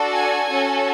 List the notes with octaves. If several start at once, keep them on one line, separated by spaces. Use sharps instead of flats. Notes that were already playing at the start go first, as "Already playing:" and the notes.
Already playing: D4 F#4 A4
G#5
C#4 F#4 A4